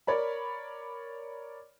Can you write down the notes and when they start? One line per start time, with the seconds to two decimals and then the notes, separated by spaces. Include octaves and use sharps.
0.07 A#4 C#5 D5 B5